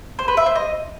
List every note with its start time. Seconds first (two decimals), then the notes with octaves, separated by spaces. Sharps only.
0.19 C5
0.28 B4
0.37 E5
0.46 C5
0.55 D#5